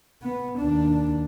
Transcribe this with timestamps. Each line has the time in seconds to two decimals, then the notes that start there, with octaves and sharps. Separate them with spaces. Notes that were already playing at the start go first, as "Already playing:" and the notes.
0.22 B3
0.59 D#2 D4